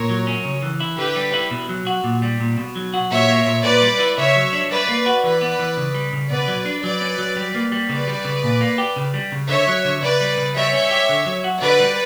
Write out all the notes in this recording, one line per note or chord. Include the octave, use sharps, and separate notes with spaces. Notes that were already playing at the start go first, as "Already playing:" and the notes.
Already playing: A#2 A#4 C#5
F#3
C#4
C#3
E3
E4
D3 G4 B4
G3
E4
B2
F#3
F#4
A#2
G3
A#2
B2
F#3
F#4
A#2 C#5 E5
A#3
A#2
A#2 B4 D5
G3
E4
C#3 C#5 E5
F#3
D4
G3 B4 D5
A#3
F#4
E3 B4 D5
B3
E3
C#3
G3
C#3
B2 B4 D5
F#3
D4
F#3 B4 D5
C#4
F#3
G3
A#3
G3
C#3 B4 D5
G3
C#3
A#2
A#3
G4
C#3
G3
C#3
D3 C#5 E5
F#3
D3
C#3 B4 D5
G3
C#3
G3 C#5 E5
C#4
G4
D3
F#3
F#4
D3 B4 D5
G3